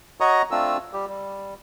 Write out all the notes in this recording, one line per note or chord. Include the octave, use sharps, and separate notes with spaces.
F#4 C#5 D#5 A#5 C#6 D#6
A3 C4 D4 F4 E6
G3 G4
G3